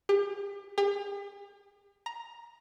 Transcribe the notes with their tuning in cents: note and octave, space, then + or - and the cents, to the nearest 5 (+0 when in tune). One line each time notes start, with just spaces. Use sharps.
G4 +40
G4 +45
A#5 +10